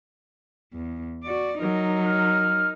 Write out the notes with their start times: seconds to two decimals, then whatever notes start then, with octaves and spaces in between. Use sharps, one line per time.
0.74 E2
1.24 F#4 D5
1.61 F#3 D#4 A#4
2.05 F6